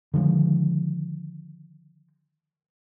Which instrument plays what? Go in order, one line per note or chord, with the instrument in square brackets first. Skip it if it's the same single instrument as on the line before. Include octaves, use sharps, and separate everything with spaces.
[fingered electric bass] D3 D#3 F3 G#3